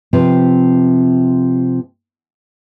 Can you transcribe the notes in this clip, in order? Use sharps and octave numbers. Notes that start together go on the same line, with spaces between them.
C3 F3 C4 B4